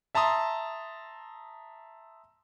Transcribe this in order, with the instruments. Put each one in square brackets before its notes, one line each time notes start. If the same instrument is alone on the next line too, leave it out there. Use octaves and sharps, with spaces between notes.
[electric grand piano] E5 A5 A#5 C6 D#6